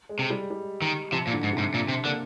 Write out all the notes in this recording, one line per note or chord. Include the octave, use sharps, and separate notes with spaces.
G#3
C3
G3
G3
D#3
C3 F3
A#2
D3
G#2
C3
G#2
A#2
C3
D3 A#3